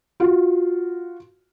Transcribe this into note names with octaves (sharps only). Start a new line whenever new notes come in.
F4 F#4